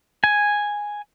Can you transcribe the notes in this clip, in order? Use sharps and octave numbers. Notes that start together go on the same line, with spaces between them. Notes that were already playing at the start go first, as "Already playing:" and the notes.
G#5